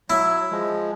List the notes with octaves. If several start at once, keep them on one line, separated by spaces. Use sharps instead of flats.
F#3 E4
F3 G#3